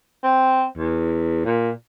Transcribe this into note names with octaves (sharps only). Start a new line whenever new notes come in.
C4
E2
A#2